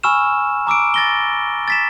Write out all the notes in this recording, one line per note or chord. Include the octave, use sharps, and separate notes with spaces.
G#5 B5 C#6 E6 F6 E7
A#5 D6 E6 D7
A6 A#6 G7
A6 B6 E7